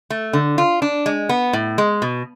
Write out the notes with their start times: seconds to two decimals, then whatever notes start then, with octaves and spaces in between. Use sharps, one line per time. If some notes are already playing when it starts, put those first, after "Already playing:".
0.10 A3
0.33 D3
0.58 F4
0.82 D4
1.06 G#3
1.29 B3
1.53 A2
1.78 G#3
2.02 B2